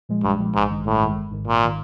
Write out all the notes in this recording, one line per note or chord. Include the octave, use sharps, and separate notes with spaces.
A#2 F3 G#3
B1 G2
A#2 F3 G#3
A1 G#2
G2 D#3 G#3
A1 A2
G2 D#3 G#3
G#1
G#2 D#3
G#1 A#2
D#3